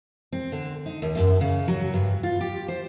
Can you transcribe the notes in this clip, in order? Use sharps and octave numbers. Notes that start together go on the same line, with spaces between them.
C4
D3
D#4
D#2
F#2
C#3
F#3
G2
F4
G4
C5